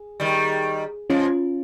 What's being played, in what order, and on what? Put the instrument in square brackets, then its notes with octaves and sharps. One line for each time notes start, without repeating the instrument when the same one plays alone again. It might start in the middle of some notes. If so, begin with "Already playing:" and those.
Already playing: [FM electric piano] G#4
[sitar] D#3 G3
[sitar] F3 G#3 [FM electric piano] C#4 F4